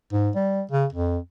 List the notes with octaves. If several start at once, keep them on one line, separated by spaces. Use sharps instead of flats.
G#2
G3
C#3
F2